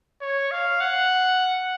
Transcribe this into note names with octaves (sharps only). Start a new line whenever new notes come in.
C#5
F5
F#5